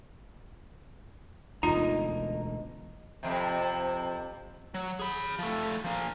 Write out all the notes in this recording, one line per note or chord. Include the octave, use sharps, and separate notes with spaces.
E1 D2 D#4 F4 D#5 A#5
F2 C3
F#3
G#4 B5
F3 A3
F3 A#3